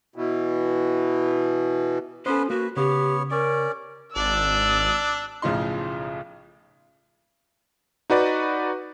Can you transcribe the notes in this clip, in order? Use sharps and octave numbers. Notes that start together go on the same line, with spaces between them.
B2 E3
B3 C#4 A4 B4 C5
A#3 F#4 B4
C#3 B3 G4 C#5
C#4 A#4 D5
G#1 D4 D5 E6
B1 A2 C#3 F3 D#4 C6
D#4 F#4 B4 D5